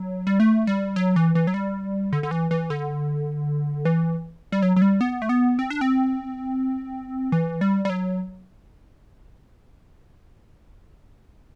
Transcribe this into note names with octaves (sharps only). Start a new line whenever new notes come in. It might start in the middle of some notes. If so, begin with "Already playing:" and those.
Already playing: F#3
G3
A3
G3
F#3
E3
E3
F#3
G3
D3
D3
E3
E3
D3
E3
G3
F#3
F#3
G3
B3
A3
B3
C4
D4
C4
E3
G3
G3
F#3